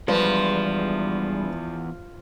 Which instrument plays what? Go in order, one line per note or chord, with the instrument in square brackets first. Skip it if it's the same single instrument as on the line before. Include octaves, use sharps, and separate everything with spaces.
[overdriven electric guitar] E2 [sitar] F3 [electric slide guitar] G3 G#3 D4 [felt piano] B4